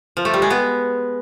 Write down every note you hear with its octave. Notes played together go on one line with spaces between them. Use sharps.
F3
A3
G3
G#3
B3